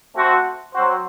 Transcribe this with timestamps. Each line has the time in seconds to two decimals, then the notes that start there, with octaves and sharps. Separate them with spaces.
0.14 A3 C4 F#4 C5
0.73 F#3 C4 F#4 C5